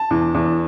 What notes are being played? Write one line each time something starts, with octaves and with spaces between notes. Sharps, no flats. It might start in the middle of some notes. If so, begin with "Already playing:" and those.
Already playing: A5
E2
E2